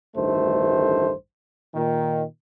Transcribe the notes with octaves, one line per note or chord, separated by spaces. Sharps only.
A1 D2 G2 D#3 A3 C5
A#2 D#3